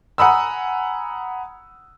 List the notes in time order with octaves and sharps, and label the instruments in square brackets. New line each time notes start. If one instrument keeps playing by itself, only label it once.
[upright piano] F#5 G#5 A#5 B5 D#6 E6